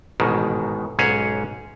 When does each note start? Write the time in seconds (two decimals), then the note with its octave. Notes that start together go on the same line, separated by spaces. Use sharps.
0.20 A1 G#2 B2 D#3
0.99 B1 G#2 C#4 G#4 C#5